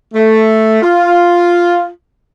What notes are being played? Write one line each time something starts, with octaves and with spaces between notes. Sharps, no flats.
A3
F4